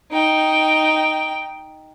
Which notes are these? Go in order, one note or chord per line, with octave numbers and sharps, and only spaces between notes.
D#4 G5